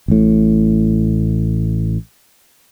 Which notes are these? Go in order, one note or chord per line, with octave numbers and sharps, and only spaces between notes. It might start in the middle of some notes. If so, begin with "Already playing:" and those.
A1 A2